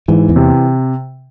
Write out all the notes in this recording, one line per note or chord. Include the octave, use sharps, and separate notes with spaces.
G#2 E3
E2
C3